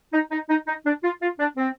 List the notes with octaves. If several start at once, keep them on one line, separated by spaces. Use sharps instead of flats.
D#4
D#4
D#4
D#4
D4
F4
F4
D4
C4